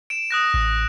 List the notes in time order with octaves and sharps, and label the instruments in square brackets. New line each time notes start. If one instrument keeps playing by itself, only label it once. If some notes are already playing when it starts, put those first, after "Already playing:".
[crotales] D7 E7
D#6 F#6 A#6
[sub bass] A1